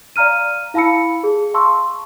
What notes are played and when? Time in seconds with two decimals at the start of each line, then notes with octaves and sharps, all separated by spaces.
0.16 D5 F5 A#5 F6 D#7
0.74 E4 F5 A5 B5 E6 C#7
1.24 G#4
1.54 F5 A5 C6 C#6 E6